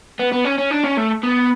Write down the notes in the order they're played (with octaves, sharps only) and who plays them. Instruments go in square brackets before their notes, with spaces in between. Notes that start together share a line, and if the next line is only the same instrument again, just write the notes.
[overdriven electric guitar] B3
B3
C#4
C#4
D4
C#4
A3
B3